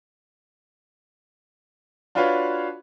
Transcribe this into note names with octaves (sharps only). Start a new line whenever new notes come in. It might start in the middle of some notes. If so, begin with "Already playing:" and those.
D4 F4 F#4 B4 C#5 F5